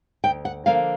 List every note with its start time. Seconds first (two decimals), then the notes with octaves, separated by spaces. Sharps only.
0.24 D2 G5
0.45 F#5
0.66 D3 F3 A#3 F5